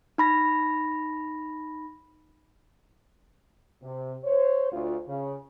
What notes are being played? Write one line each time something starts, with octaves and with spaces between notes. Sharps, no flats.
D#4 B5 A#6
C3
C5 C#5
D2 F4
C#3